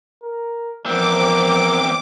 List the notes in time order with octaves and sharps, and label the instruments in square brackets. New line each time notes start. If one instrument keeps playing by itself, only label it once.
[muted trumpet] A#4
[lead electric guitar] E2 C4 [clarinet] F3 [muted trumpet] A#4 [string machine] D6